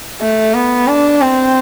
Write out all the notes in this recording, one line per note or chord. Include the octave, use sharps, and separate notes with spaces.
A3
B3
D4
C4